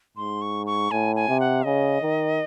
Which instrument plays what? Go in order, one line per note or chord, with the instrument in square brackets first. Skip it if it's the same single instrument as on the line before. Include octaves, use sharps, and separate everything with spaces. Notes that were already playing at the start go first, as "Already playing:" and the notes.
[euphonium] G#2 [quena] C6
[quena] C#6
C#6
[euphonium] A2 [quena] G#5
[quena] G#5
[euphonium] C3
[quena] F#5
[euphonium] C#3 [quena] D#5
[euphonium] D#3